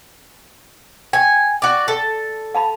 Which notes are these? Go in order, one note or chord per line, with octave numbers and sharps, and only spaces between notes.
G5 G#5
F#4 D5
A4
F5 A5 B5